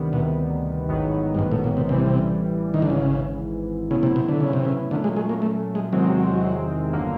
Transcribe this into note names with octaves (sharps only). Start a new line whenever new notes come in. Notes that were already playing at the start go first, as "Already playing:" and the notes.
Already playing: D2 C3 D#3 G3 B3
B2
A1 G#2 D#3 F#3 B3
G2
G#2
A2
A#2
C3
A1 A2 C3 E3 G3
D#3
D3
G#1 G#2 C#3 E3
A2 C#3 F#3 B3 E4
C3
C3
D3
C#3
C3
C#3
A#2 D3 F#3 A3 C#4
G#3
G#3
A#3
A3
G#3
E2 C3 D#3 F#3 G#3 C4
G1 D3 F#3 A#3